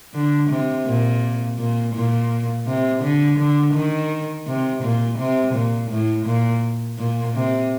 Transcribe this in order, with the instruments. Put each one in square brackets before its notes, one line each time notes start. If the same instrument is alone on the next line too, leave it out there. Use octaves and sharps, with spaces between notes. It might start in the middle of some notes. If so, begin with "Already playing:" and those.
[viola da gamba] D3
C3
A#2
A#2
A#2
C3
D3
D3
D#3
C3
A#2
C3
A#2
A2
A#2
A#2
C3